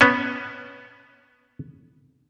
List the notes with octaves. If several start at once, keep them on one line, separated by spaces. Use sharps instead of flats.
B3 C#4